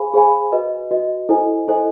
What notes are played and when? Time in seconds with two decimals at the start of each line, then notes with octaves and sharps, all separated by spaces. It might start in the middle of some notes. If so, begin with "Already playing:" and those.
Already playing: G#4 C5 F5 G#5 B5
0.14 G#4 C5 F5 G#5 B5
0.52 F#4 B4 D#5
0.91 F#4 B4 D#5
1.29 E4 A4 C5 D#5 G#5
1.68 E4 A4 C5 D#5 G#5